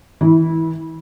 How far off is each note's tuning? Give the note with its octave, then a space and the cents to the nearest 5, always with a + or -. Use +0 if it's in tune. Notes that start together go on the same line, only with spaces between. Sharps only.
E3 -30 E4 -10